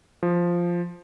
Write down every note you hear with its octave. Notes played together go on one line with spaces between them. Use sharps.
F3